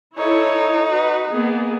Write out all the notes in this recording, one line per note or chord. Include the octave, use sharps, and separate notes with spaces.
D#4 E4 A4 C#5
F#4 B4
A#3 B3 G#4